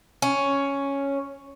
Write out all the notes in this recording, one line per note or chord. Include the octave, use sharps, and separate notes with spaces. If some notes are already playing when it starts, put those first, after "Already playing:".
C#4